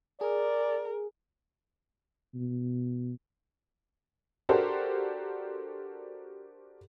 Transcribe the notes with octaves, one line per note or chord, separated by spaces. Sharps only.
G#4 A#4 D5
B2
D4 F#4 G4 A4 A#4 C5